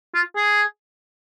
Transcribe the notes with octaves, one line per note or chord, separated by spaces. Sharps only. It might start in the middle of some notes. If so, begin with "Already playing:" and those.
F4
G#4